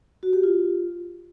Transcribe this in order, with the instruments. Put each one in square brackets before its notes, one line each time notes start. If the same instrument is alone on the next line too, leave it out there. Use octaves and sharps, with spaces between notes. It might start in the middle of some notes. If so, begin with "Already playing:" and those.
[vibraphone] F#4
G4
F4